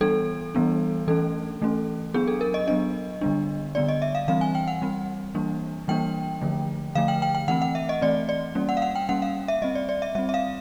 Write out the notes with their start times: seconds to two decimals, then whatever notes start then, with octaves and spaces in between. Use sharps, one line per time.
0.01 E3 G3 B3 D4 A4
0.55 E3 G3 B3 D4
1.08 E3 A3 C#4 A4
1.61 E3 A3 C#4
2.14 F#3 B3 D4 G#4
2.28 A4
2.41 A#4
2.54 D#5
2.68 F#3 B3 D4 D#5
3.21 D3 G3 B3 D4
3.75 D3 G3 B3 D4 D5
3.88 D#5
4.02 E5
4.15 F5
4.28 E3 G3 C4 F5
4.41 G#5
4.55 G5
4.68 F#5
4.82 E3 G3 C4
5.35 E3 G3 A#3 D4
5.88 E3 G3 A#3 D4 G5
6.41 D3 F3 A3
6.95 D3 F3 A3 F5
7.08 G5
7.22 G5
7.35 G5
7.48 E3 A3 C4 F#5
7.62 F#5
7.75 E5
7.89 D#5
8.01 E3 A3 C4 D5
8.29 D5
8.55 G3 A#3 C#4
8.69 F#5
8.77 F5
8.82 F#5
8.95 G5
9.09 G3 A#3 C#4 F#5
9.22 F5
9.48 E5
9.62 G3 C4 D#5
9.75 D5
9.89 D5
10.02 E5
10.15 G3 C4 E5
10.29 E5
10.34 F5